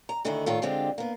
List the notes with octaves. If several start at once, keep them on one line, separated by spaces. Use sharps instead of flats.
A#5
D2 D3 D#3 D#4 E4
A2 D#3 F4 A4
D3 G#3 C4 D4 F4 G4
A#3 B3